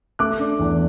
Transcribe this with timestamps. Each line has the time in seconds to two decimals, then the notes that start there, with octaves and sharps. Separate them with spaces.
0.19 A3 D6 F#6
0.39 D4
0.59 E2